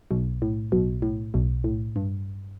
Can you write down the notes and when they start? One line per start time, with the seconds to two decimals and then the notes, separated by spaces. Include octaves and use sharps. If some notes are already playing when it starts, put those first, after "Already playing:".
0.11 B1 B2
0.42 A2
0.72 B1 B2
1.02 A2
1.34 B1 B2
1.64 A2
1.96 G2